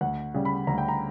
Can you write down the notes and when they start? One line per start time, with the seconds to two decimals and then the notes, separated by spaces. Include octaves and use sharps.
0.01 D2 F#5
0.34 C#3 G3
0.45 B5
0.67 D2 A#5
0.78 G5
0.88 A#5